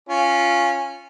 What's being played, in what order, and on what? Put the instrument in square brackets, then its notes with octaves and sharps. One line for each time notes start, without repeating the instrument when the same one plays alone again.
[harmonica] C#4 F4